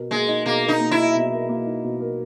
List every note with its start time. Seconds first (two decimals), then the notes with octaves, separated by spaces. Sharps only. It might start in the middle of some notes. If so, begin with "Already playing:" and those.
Already playing: B2 A#4
0.11 G#3 A#3
0.28 D#4
0.45 B2 A#3
0.63 A#4
0.68 D#4
0.80 A#3
0.91 E4
0.98 D#4
1.15 B2
1.32 A#4
1.49 A#3
1.66 D#4
1.84 B2
2.01 A#4